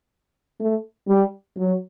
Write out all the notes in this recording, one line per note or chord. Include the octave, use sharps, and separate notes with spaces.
A3
G3
F#3